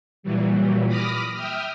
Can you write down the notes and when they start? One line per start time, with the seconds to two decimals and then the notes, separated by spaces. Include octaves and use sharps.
0.23 A#2 E3 F#3 G3
0.88 B5 D6 D#6 F6 A#6
1.34 E5 G5 D#6 F6